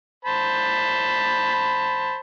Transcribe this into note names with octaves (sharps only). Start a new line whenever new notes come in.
C5 A5 B5